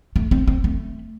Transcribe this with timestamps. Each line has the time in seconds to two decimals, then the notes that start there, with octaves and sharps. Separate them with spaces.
0.16 A3
0.31 C4
0.47 C4
0.64 A3